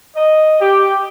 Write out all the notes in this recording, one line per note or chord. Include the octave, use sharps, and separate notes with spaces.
D#5
G4